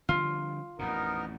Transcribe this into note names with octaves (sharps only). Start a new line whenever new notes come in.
D3 F3 G3 F4
A1 F2 A#2 B3 D#4 A#4